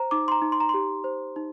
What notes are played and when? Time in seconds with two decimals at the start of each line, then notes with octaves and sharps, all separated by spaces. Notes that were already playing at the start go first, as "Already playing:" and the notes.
Already playing: C5 A#5
0.11 D#4 D6
0.28 C6
0.32 A#5
0.42 D#4
0.52 C6
0.60 A#5
0.69 G4 C6
1.04 C5
1.36 D#4